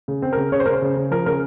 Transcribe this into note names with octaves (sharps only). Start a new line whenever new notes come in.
C#3
C4
C#3 A#4
C#3 C#5
C5
C#3 A#4
C5
C#3
C#3
F3 A#4
C#3 A#4